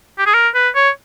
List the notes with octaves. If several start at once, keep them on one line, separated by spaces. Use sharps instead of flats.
G4
G#4
A#4
B4
C#5